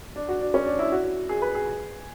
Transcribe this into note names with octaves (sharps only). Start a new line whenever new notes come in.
D4
F#4
D4
C#4
D4
E4
F#4
G#4
B4
G#4